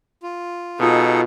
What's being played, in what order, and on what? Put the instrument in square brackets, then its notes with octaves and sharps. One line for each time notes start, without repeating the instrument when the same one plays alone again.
[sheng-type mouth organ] F4
[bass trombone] B2 [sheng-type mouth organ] D#4 G#4 A4 [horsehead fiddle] F4